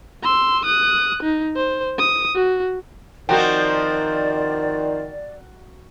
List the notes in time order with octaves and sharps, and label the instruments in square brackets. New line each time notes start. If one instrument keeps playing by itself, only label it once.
[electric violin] C6 E6
D#6 F#6
D#4
C5
D#6
F#4
[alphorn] D#3 [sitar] F3 C4 D#4 [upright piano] F#4 A#4 G5 [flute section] D5